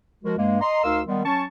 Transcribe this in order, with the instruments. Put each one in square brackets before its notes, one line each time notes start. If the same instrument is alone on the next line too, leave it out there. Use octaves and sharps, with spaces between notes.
[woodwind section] F3 G#3 F#4 A#4
G2 G#3 A#3
D#5 A#5 C6
D2 D#4 A#4 F5 C6 E6
D#3 G3 G#3 B3
F#3 C#4 A5 C#6